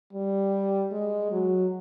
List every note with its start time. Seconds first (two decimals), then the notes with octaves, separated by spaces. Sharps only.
0.13 G3
0.92 G#3
1.31 F#3